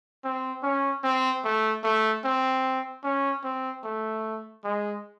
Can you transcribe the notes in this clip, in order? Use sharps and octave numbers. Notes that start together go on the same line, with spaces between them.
C4
C#4
C4
A3
A3
C4
C#4
C4
A3
G#3